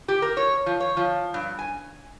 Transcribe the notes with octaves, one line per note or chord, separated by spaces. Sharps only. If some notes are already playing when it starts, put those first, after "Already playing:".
G4
A#4
C#5
F3
C#5
F3
G2
G#5